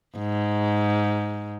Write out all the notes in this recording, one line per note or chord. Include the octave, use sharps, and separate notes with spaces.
G#2